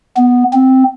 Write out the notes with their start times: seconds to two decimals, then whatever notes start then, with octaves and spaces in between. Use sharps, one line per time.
0.17 B3
0.53 C4